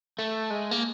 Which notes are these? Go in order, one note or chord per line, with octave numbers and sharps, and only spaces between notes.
A3
G#3
A#3